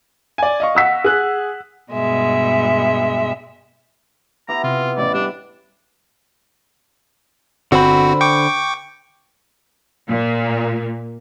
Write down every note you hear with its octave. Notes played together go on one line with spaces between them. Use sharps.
D5 G#5
D#5 F5 C#6
F#5 E6 B6
G#4 F#6
G2 B2 G#3 E5
B3 E4 G4 A#5
C3 F4
A1 D5
G3 D4
G1 D3 C4 F#4 C5 B5
G5 C#6 D6
A#2